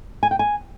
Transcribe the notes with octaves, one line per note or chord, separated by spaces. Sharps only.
G#5
G5
G#5